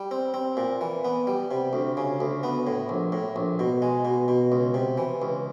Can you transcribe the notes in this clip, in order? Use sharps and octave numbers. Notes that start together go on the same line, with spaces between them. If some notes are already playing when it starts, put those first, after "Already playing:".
Already playing: G3
C4
C4
A#2
E3
B3
G3
C3
D2
C#3
D2
B3
A2
A#1
A2
A#1
B2
G#3
B2
B2
C#2
C3
E3
C#2